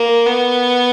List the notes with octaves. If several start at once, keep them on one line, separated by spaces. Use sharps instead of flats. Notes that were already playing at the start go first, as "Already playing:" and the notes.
Already playing: A#3
B3